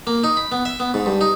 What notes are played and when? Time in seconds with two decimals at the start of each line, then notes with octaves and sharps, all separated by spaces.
0.07 A#3
0.24 D#4
0.37 B5
0.52 B3
0.65 E5
0.80 B3
0.94 G#2
1.06 G2
1.21 D#4